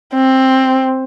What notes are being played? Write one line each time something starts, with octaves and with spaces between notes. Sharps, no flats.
C4